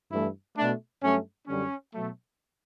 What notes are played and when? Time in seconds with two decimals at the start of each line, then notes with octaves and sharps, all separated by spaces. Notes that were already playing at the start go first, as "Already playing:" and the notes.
0.11 G2 E3 A3 E4
0.56 B2 A3 D4
1.01 G2 F#3 A3 C#4
1.47 F#2 D3 G3 C#4
1.93 B2 F#3 A3